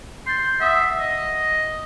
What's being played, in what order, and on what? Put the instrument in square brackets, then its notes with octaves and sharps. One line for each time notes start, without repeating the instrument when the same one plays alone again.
[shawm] C6 [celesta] G6 A6
[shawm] E5 [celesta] F#5 D#6 C7
[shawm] D#5